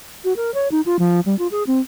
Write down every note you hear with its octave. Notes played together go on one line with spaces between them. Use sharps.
F#4
A#4
C#5
D#4
F4
F3
G3
F4
G#4
C4